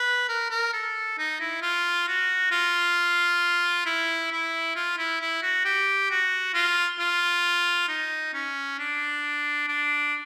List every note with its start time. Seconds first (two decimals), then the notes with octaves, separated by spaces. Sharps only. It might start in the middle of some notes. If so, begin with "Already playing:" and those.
Already playing: B4
0.28 A#4
0.50 A#4
0.73 A4
1.18 D#4
1.41 E4
1.62 F4
2.08 F#4
2.51 F4
3.86 E4
4.31 E4
4.75 F4
4.98 E4
5.21 E4
5.42 F#4
5.64 G4
6.10 F#4
6.54 F4
6.99 F4
7.88 D#4
8.33 C#4
8.79 D4
9.68 D4